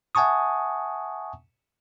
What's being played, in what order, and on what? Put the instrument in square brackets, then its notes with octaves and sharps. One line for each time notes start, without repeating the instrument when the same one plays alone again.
[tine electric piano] E5 F#5 G#5 A5 C#6 D#6